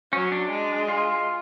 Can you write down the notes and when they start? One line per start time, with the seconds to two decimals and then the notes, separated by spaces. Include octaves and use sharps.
0.13 F#3 C#4
0.32 D4
0.50 G#3
0.88 F4